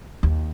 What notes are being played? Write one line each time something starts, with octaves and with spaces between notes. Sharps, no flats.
D#2